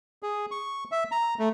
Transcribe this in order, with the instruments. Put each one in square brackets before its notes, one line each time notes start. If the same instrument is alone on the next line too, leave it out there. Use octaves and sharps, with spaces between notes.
[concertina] G#4
C#6
E5
A#5
A3